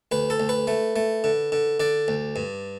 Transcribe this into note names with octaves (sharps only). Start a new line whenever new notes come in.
D2 B4
A4
D2
B4
A3
A3
D3
D3
D3 D5
D2
G2